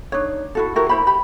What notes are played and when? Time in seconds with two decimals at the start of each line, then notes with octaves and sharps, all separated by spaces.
0.12 D4 D#4 C#5
0.55 E4 F#4 A4
0.76 E4 F#4 G4 A#4
0.89 E4 C5 B5
1.07 G4 B5